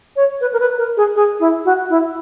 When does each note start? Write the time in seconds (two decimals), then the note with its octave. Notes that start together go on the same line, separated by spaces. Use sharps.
0.16 C#5
0.41 B4
0.53 A#4
0.60 B4
0.78 A#4
0.97 G#4
1.16 G#4
1.40 E4
1.65 F#4
1.90 E4